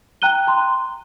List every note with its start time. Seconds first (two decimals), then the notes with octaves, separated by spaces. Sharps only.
0.22 G5 A#5 F#6 D#7 G7
0.47 A#5 C6